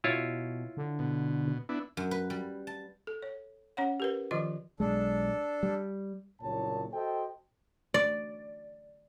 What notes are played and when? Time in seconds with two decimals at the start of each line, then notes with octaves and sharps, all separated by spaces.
0.04 B2 E4 F4 C#5
0.77 D3
0.99 B2
1.69 B3 D4 E4
1.97 F#2
2.11 B4
2.30 G3
2.67 A5
3.07 A4
3.23 C#5
3.77 C#4 C#5 F#5
4.00 G4 A#4 B4
4.31 D#3 F3 F4 D#5 C6
4.80 B1 G#3 D4 A4
5.63 G3
6.42 F#1 C2 A#2 C#5 A5
6.93 F#4 A4 C5 D#5 G5
7.94 D5